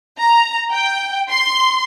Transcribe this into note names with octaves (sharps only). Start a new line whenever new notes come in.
A#5
G5
C6